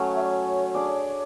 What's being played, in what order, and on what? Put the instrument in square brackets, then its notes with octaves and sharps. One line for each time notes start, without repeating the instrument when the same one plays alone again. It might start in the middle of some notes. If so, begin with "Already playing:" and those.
Already playing: [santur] F#3 A3 C#4
[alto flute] F#5
E5
D5
C#5
[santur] D4 G#4 D5 [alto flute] C#5